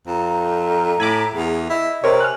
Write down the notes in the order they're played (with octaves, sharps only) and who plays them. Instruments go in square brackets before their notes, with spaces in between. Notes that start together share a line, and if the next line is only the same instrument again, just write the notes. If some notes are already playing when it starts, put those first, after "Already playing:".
[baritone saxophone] F2 [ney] A#5
[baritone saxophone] A2 [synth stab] G#5 B5 D6
[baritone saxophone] E2 [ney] G#4
[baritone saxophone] E4 [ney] D#5
[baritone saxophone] C3 [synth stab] C4 A#4 C#5
[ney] G#5 [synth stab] F6 F#6